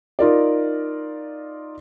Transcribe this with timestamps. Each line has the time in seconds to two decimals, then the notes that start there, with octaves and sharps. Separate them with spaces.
0.19 D#4 F4 A#4 D5